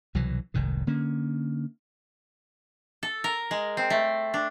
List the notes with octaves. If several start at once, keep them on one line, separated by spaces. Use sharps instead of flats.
C2 B2 E3 F#3
F1 C2 G#2 D#3
D3 A#3 C#4
A4
A#4
G#3
C4
A3
D4